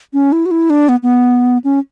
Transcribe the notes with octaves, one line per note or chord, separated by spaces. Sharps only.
C#4
E4
F#4
E4
D4
B3
B3
C#4